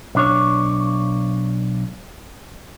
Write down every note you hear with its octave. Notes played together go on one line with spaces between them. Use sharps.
B1 D4 C#5